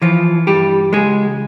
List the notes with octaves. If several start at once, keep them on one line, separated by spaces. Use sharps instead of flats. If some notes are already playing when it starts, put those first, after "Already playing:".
E3 F3 F4
G2 G3 G4
C#2 G#3 G#4